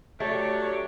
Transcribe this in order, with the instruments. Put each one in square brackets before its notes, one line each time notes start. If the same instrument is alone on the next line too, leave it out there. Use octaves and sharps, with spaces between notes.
[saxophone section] F#3 D4 G4 [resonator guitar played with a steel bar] A3 [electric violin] C#5